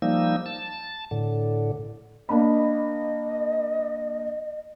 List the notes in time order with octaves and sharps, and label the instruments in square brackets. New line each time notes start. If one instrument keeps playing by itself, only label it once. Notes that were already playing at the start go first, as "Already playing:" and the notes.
[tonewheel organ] F3 G3 A#3 D#4 E6
A5
A2 D3
[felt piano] A#3 D4 B5 [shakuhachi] D#5